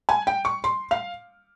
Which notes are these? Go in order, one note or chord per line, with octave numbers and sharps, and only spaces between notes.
G#5
G5
C#6
C6
F5